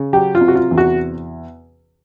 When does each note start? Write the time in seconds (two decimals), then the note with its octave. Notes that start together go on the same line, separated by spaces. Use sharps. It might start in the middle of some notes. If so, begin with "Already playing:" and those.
Already playing: C#3
0.13 F#3 G4
0.35 F4
0.41 C3
0.48 F#4
0.56 F4
0.71 E2
0.78 F#4